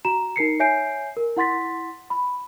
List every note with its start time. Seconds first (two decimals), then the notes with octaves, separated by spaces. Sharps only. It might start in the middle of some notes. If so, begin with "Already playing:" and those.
0.05 F#4 A#5 E7
0.36 D#4 A#4 C7 C#7
0.60 C#5 E5 G#5 G6 C7 D7
1.17 A#4
1.37 E4 F#5 C6 A6 B6
2.10 B5